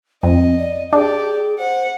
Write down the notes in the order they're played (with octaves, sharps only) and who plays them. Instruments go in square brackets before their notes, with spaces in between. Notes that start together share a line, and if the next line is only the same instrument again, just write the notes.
[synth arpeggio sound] F2 [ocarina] C4 [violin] D#5
[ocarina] D5
[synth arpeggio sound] D4 [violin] G4 D5 [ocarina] G#4
[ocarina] C5 [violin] F#5